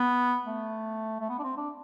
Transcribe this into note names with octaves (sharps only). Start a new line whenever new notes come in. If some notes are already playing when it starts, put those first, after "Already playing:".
Already playing: B3
A3
A3
B3
D4
C4
D4